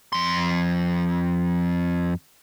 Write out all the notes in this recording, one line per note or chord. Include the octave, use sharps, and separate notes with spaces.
F2 C6